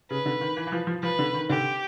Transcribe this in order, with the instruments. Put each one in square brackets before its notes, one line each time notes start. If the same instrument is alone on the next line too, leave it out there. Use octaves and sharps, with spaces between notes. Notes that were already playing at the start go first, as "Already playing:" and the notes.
[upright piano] C#3 [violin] B4
[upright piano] D3
D#3
E3
E3
F3
F3
[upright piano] F3 [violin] B4
[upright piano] D3
D#3
[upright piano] D3 [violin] G4